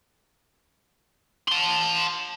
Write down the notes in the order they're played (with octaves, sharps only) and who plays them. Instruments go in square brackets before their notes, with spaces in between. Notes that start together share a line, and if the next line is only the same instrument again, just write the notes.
[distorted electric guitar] A5 C6